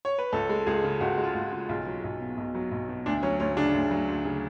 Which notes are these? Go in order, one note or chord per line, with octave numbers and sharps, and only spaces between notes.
C#5
B4
C#2 A4
G#3
C#2 G#4
C#3
C#2 F#4
G#3
F4
C#2
C#3
B1 F4
F#3
B1
B2
B1
F#3
B1
B2
D2 D4
F#3 C#4
D2 C#4
C#3 D4
D2
F#3
D2
C#3